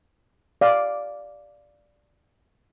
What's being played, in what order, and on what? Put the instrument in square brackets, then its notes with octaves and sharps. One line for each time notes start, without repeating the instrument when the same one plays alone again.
[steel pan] D5 F5